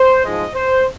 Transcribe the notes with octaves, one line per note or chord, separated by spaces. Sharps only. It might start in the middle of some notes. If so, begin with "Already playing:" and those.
Already playing: C5
G#2 F3 G#3 D#5
C5